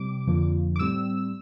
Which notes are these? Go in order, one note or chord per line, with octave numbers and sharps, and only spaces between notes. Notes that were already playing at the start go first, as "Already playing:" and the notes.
Already playing: C3 G3 C4 D6
F2 D3 F3 A#3
D6
A2 G3 C4 E6